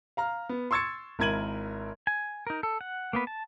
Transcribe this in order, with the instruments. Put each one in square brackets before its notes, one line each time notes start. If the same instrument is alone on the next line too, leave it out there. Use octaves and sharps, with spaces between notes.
[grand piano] F5 A#5 F6
B3
C6 C#6 E6 G#6 A6 C#7
G#1 E4 A#4 G#6 D#7 F#7
[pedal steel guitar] G#5
D#4 A#4
A4
F#5
A#3 B3 B4
A5